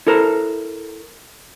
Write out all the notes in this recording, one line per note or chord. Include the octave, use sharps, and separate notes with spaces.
E4 A4 A#4 C5